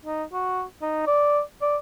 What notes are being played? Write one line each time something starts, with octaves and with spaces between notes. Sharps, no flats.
D#4
F#4
D#4
D5
D5